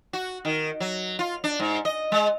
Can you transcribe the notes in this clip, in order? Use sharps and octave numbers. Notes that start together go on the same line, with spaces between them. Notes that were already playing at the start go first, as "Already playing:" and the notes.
F#4
D#3
F#3
F4
D4
G#2
D#5
G#3